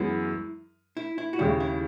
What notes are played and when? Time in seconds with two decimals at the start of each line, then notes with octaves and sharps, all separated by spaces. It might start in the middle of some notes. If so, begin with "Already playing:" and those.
Already playing: F#2 E3 G#3 B3 E4
0.97 E4
1.18 E4
1.33 F#4
1.39 D#2 C#3 G#3 E4
1.60 E4